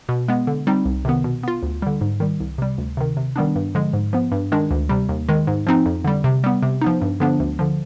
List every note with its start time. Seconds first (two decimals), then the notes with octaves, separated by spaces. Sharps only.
0.09 B2
0.28 G#3 B3
0.47 D3
0.67 G3 C4 D#4
0.85 C2
1.05 C3 D#3 B3
1.24 B2
1.43 B3 F4
1.63 D2
1.82 D3 G3
2.01 G#2
2.20 D#3 G3
2.40 C2
2.58 C3 G3
2.78 D2
2.97 C3 D#3
3.17 C3
3.36 D#3 G3 B3 D4
3.56 G2
3.75 D3 F3 G#3
3.93 G#2
4.13 F3 B3
4.32 G2
4.52 D#3 G#3 D4
4.71 D2
4.89 C3 G3
5.09 D#2
5.29 D#3 G#3
5.47 G#2
5.67 F3 C4 D#4
5.86 F2
6.05 D3 G3
6.24 C3
6.44 G3 B3
6.63 C3
6.82 F3 B3 D#4
7.01 G2
7.20 D3 F3 B3 D4
7.40 D2
7.59 D3 F3